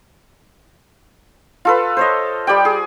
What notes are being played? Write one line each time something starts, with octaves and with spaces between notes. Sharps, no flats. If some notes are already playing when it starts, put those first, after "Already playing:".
F4 A4 B4
C5 C#5 D#5
G3 G4 D5 G5
G#4